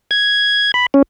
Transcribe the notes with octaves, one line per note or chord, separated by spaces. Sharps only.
G#6
B5
C#4